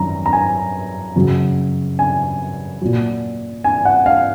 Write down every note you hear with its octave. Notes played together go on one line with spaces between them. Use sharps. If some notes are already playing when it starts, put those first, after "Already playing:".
Already playing: F#2 D#3 A#5
A#5
G#5
F#2 C#3 F#3
G#5
A#2 F#3
G#5
F#5
F5